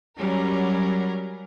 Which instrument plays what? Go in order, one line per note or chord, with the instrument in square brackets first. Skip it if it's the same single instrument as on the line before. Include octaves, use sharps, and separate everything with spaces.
[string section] F#3 G3 C#4 A#4